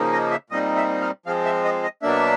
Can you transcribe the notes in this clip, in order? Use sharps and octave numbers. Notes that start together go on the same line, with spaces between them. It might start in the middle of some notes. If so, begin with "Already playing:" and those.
Already playing: C#3 F3 A#3 D#4
D#5
E5
A#2 G3 C4 D#4 D#5
E5
F5
F3 G#3 C4 F5
E5
D#5
D#5
B2 F#3 A#3 D4 E5